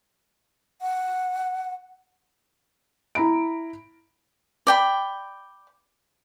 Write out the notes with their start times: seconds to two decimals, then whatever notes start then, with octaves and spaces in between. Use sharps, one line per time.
0.82 F#5
3.15 E4 A#5 B5 D7
4.67 D5 G5 B5